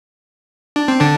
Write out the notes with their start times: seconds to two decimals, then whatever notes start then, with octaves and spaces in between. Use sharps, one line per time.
0.76 D4
0.88 C4
1.00 D3 D4